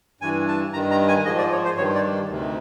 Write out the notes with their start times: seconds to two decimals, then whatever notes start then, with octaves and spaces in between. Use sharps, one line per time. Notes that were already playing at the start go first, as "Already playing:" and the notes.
0.21 G2 E3 G#5
0.48 A5
0.73 G2 D#3 A#5
0.91 A#5
1.08 G#5
1.25 G#2 D#5
1.28 F3
1.38 D5
1.52 C#5
1.65 C5
1.77 G2 D#3 C#5
1.95 D5
2.29 D2 C3 D#3